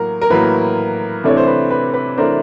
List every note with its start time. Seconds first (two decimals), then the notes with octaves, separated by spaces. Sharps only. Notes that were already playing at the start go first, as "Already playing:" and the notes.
Already playing: A2 F#3 A#3 A#4
0.22 A#4
0.30 A2 F#3 A#3 B4
1.24 C3 E3 A3 D4 C#5
1.37 C5
1.47 B4
1.70 B4
1.94 B4
2.18 C3 E3 A3 D4 A#4 C5